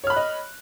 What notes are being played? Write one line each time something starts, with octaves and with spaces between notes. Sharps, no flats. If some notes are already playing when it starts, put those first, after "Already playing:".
C#5 D#5 B5 F6 F#6